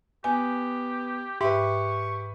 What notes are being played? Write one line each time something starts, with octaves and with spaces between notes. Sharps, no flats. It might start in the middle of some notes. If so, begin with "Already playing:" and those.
B3 G4 G#5
G#2 G4 B4 E5 C#6